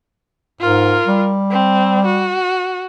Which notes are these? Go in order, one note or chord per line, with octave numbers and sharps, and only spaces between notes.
G#2 F4 A#4
G3
C4
F#4